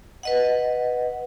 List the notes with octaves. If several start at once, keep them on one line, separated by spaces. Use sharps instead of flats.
B4 D#5 F#5